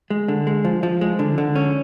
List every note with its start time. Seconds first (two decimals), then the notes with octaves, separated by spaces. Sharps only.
0.10 G#3
0.28 D3
0.47 G#3
0.65 F3
0.83 F3
1.01 G#3
1.19 D3
1.38 D3
1.56 C#4